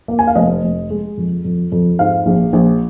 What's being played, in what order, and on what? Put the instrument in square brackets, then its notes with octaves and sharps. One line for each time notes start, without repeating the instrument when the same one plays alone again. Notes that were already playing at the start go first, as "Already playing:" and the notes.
[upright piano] A#3
G#5
F5
F1 D#5
F1
G#3
F2
F2
F2
G#2 F5
A#1
A#1